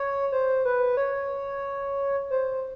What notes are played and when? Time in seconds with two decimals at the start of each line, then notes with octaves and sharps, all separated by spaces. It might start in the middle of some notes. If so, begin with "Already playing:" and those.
Already playing: C#5
0.32 C5
0.65 B4
0.97 C#5
2.30 C5